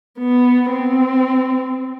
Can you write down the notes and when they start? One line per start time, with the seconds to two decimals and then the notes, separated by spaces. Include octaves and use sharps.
0.19 B3
0.71 C4